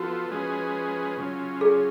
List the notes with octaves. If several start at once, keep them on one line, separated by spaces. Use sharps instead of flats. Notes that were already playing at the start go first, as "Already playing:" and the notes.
Already playing: F3 B3 F4 F#4 A4
F3 G#3 C#4 G#4 B4
C#3 F#3 C#4 F4
G#4